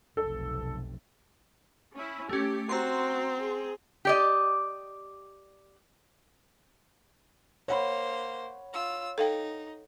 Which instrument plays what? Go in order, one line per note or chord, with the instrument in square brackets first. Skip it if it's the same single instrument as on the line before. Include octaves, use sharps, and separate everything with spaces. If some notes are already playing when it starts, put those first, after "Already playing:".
[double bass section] F1 B1 C3 [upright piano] A4
[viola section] C#4 E4
[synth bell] A3 C#4 [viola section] G4
[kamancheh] C4 [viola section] F#4 [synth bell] A#5 C6
[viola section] G#4
[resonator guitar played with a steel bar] G4 D5 D#5
[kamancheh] A#3 C5 [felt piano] C#5 F#5 B5
[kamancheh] F4 E6
[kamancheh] D#4 [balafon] A4 F5 G5